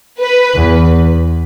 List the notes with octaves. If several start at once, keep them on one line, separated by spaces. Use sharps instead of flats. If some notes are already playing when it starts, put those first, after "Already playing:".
B4
E2